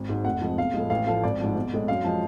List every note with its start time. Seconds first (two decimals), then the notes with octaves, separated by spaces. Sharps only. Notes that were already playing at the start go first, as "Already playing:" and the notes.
Already playing: G#1
0.09 G#2 F#3
0.25 F1 F#5
0.41 F2 F3 G#3
0.57 B1 F5
0.74 A2 F3 G#3
0.90 A1 F5
1.07 A2 F3 A3 F5
1.24 G#1 D5
1.40 G#2 F3
1.55 B1
1.73 A2 G#3
1.88 F#2 F5
2.04 F3 G#3